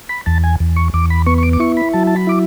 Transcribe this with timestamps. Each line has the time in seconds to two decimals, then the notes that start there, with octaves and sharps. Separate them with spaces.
0.09 B5
0.26 E2 A5
0.44 G#5
0.60 E2
0.76 C#6
0.94 E2 D6
1.10 B5
1.26 B3 C#6
1.38 C#6
1.43 D6
1.53 D6
1.60 E4 C#6
1.77 B5
1.93 F#3 A5
2.07 A5
2.16 B5
2.27 E4 D6